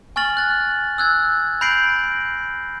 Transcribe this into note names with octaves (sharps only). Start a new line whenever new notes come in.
G#5 C#6 F6 A6 F#7
F#6 A6
E6 F#6 G#6
B5 G6 A#6 C7 D7 F#7